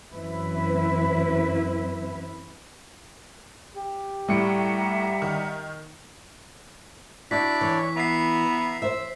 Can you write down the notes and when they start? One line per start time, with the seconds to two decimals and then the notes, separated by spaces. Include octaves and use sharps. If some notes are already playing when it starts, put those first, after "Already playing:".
0.13 F#2 E3 C4 E4 B4 E5
3.75 G4
4.29 A2 G3 E5 F#5 A#5 C#7 D7
5.22 D#3
7.31 D4 E4 F#4 D5 B6
7.61 E3 C#5
7.97 B3 E5 A#5 B6 C7
8.82 C5 E5 E6